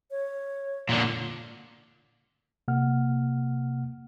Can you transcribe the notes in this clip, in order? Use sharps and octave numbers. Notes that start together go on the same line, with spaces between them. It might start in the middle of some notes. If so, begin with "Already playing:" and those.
C#5
A#2 D3
C3 A#3 F#5 F6